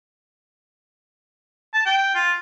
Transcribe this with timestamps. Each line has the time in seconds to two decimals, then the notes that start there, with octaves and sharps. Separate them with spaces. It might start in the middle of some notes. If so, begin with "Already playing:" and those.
1.74 A5
1.86 G5
2.15 F4